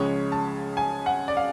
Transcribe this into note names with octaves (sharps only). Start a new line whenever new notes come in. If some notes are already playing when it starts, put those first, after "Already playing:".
Already playing: C#2 C#3 F3 G#3 C#5
A5
G#5
F#5
D5
F5